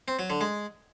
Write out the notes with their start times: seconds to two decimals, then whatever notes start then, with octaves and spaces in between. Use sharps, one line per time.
0.08 C4
0.19 F#3
0.30 D3
0.41 G#3